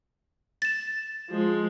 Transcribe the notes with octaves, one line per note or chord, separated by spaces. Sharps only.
A6 E7
F3 G#3